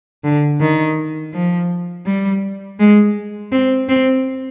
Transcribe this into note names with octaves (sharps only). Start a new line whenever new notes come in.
D3
D#3
F3
G3
G#3
C4
C4